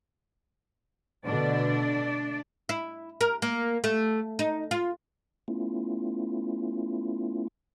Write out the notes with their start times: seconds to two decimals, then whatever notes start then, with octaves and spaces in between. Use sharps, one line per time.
1.26 B2 D3 A3 D4 D5
2.69 E4
3.21 A#4
3.42 A#3
3.84 A3
4.39 D#4
4.71 F4
5.48 A3 B3 C#4 E4 F4